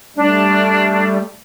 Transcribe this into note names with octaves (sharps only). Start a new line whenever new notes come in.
G3 A3 D4